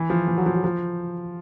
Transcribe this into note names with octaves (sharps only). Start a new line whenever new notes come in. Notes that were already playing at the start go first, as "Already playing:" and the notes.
Already playing: E3
F3
E3
F#3
F3
F#3
F3